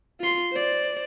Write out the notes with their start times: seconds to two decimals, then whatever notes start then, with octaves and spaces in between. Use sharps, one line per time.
0.20 F4 C6
0.52 C5 D5